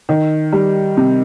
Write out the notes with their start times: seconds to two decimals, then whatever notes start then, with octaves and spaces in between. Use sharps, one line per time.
0.09 D#3
0.52 G3
0.97 C3